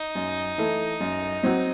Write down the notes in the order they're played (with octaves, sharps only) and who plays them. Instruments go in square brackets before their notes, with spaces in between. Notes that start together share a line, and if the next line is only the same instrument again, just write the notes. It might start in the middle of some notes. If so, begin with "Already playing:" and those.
Already playing: [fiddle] D#4
[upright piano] F#2
E3 A3 E4 A4
F#2
F#3 C4 F#4